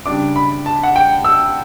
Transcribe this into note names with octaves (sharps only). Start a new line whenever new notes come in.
C#3 G3 D4 D6
B5
A5
F#5
G5
E6